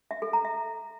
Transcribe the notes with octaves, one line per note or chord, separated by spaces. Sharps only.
E5
A4
A#5
E5